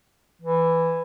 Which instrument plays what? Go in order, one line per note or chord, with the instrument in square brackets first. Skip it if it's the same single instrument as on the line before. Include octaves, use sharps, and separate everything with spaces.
[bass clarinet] E3